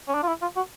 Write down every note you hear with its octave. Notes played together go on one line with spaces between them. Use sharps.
C#4
D4
F4
E4
F4
F#4